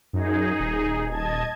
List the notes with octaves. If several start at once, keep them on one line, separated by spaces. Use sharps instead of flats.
F#2 D#4 G#4
D#1
D#5 A5 G#6